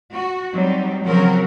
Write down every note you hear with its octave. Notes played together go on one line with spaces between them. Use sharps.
F#4
F#3 G3 C4 D#4
C#3 F3 F#3 C4 F#4 A#4